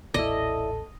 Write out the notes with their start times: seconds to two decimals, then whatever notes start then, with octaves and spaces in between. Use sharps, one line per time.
0.14 D#1 A1 E4 A4 D5 D#5